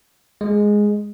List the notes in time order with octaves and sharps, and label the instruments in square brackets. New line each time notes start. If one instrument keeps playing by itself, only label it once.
[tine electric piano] G#3